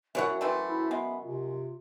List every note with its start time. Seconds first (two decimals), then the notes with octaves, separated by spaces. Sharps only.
0.15 F#2 F#3 E4 C#5 E5 F#5
0.41 E3 A3 C4
0.68 E4
0.91 G#3 B3
1.23 C3 F4